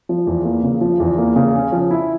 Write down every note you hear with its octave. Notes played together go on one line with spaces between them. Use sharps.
F3
E2
A#3
C#3
F3
E2
A#3
C#3
C#4
F3
E4